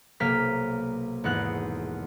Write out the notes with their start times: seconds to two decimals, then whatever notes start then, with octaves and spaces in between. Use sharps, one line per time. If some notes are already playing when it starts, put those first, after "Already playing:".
0.20 B1 C3 A#3 F6 B6
1.24 G#1 E2 B3 D#4 F#5 F#6